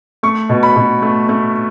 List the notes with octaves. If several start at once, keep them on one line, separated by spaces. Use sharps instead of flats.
A3 C#6
B2
B5
B2
A3
A3